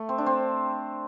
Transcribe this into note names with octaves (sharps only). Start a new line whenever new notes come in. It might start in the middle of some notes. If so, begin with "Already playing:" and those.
Already playing: A3
C4
D4
C4